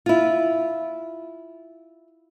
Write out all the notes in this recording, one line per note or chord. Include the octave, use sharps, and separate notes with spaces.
E4 F4